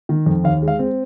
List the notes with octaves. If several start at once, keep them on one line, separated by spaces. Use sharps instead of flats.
D#3
F2
D#2 F5
G#3
F5
C4